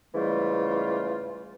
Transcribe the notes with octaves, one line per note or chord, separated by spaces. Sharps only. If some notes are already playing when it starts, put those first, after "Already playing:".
G#2 C#3 E3 G3 A3 F4